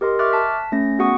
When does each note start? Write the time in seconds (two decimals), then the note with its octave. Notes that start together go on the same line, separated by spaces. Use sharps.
0.01 G4 A#4 D#5 C6
0.19 E5 C#6 D6 F6 F#6 A6
0.33 A5 B6
0.72 A3 C#4 A#6
0.99 B3 F#4 G#4 F#5 C#6 D#6